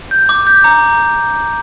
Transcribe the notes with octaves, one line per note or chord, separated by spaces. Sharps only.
G6
D6
G6
A#5